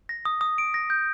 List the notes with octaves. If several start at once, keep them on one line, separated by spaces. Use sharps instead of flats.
A#6
D#6
D#6
D7
A#6
G6